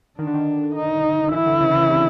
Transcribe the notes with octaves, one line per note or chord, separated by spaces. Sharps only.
D#3 D4
D3
D#3
D#4
E3 E4
D3
C#3
C#3
C3